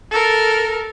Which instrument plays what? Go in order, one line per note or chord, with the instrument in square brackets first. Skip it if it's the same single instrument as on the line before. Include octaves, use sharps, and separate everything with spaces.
[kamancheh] A4 A#4